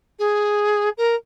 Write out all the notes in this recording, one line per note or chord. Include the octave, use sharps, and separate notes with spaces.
G#4
A#4